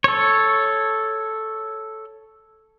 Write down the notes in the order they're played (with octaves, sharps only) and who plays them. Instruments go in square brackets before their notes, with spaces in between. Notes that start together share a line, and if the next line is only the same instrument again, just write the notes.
[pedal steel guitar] A4 C#5